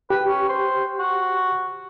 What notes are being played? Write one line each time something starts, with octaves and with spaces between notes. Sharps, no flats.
G4 B4
C#4
C5
F#4